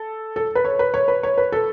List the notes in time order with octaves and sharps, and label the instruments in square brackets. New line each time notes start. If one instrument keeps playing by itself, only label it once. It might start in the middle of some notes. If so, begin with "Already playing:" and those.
Already playing: [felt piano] A4
A4
B4
C#5
B4
C#5
B4
C#5
B4
A4